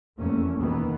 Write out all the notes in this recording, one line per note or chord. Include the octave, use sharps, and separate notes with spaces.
F1 E2 A3 A#3 C#4
D#2 B2 D#3 E3 B3